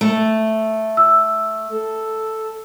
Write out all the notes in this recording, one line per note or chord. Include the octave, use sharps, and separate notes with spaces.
A3
E6
A4